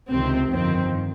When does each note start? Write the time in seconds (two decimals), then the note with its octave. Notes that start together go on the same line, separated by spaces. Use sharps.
0.10 C#2 C3 D#3 C4
0.50 G1 F2 D#3 C4